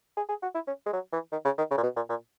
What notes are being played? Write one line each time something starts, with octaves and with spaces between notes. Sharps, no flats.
G#4
G#4
F#4
E4
C#4
G#3
F#3
E3
D#3
C#3
D#3
C#3
A#2
B2
A#2
A#2